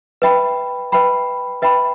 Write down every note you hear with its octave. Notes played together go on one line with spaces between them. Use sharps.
B4 E5 G5 B5
B4 E5 G5 B5
B4 E5 G5 B5